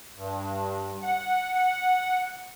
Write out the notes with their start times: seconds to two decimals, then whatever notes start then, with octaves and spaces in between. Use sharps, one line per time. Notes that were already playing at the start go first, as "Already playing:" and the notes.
0.16 G2
1.03 F#5
1.54 F#5